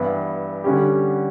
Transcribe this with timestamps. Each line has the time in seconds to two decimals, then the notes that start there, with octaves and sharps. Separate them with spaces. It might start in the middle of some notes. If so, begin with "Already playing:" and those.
Already playing: G2 E3 B3 E4
0.64 D3 G3 C#4 G4